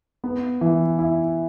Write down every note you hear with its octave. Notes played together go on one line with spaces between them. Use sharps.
B3
E3
E4